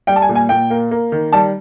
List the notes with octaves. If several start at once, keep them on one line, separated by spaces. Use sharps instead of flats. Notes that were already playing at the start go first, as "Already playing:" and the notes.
G3 G5
A5
G#5
A#2
G#5
A#2 G5
A#3
A#3
D#3
G3 A5